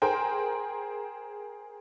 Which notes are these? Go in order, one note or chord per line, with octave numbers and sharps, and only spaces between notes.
G#4 A#4 C5 G5 G#5